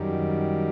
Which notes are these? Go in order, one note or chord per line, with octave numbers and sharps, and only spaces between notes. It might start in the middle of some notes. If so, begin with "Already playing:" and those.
Already playing: F#2 D#3 G3